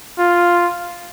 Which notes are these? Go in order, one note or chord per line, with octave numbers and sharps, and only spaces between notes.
F4